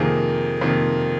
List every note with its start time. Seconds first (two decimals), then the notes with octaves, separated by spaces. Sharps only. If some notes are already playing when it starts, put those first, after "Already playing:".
Already playing: F2 C3 D#3 A#3 G#4
0.61 F2 C3 D#3 A#3